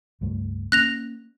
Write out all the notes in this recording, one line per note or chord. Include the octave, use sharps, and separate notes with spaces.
C#2 G2 A3
A#3 C#4 F#6 A#6 F7